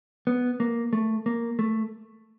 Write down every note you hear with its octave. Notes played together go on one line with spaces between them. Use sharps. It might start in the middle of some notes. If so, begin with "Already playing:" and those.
B3
A#3
A3
A#3
A3